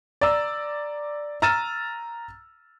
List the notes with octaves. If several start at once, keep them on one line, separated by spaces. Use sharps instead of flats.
D5 A#5 E6
A#5 E6 F6 A6 D#7 E7